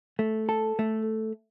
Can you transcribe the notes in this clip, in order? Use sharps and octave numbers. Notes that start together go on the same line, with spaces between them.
A3
A4
A3